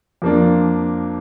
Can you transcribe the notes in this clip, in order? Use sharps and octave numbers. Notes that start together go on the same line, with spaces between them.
F2 F3 A#3 D4